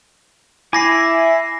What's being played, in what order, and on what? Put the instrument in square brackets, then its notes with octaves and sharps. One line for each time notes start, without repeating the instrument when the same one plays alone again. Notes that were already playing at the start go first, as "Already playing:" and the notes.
[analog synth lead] E4 [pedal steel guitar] G#5 D6 [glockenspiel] B5 A#6 C7